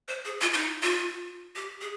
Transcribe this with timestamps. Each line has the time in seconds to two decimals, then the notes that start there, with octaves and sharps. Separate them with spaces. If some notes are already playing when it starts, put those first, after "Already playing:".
0.08 C5
0.25 G#4
0.41 F4
0.53 F4
0.57 D#4
0.83 F4
1.56 G4
1.81 G#4